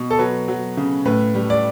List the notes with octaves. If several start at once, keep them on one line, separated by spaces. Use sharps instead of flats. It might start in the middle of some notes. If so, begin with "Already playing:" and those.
Already playing: B2
A4
F#3 B4
F#3
C#3
A2 B4
G3
D5